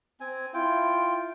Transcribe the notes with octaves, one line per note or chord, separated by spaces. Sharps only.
C4 G#5
E4 F4 G5